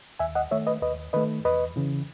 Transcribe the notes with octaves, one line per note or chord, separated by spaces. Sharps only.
D#2 E5 G#5
D#5 F#5
D#3 A3 C#5 E5
B4 D#5
D#2 B4 D#5
D#3 A3 B4 D#5
E2 B4 D#5
C#3 E3